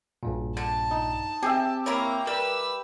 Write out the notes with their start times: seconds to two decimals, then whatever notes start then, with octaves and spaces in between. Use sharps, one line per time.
0.23 A#1 G2 A#2
0.57 D3 A5
0.91 D#4
1.43 C4 G4 G#4 E5
1.86 A#3 E4 A#4 C#5 A#5
2.27 G3 A#4 B4 E6